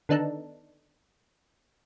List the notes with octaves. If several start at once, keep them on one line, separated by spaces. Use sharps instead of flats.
D3 D#3 B3 D4 D#4 A4